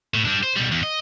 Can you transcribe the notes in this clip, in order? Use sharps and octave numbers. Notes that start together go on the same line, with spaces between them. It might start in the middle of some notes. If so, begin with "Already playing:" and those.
A2
G3 D4
C5
B2 G3
E2
D#5